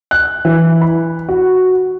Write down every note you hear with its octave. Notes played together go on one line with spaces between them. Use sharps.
F#6
E3
B5
F#4